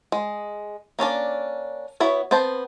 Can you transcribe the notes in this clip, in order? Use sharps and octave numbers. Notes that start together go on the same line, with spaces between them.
G#3
A#3 C#4 D4 D5
B3 E4 F#4 C#5
B3 C4 C5 A5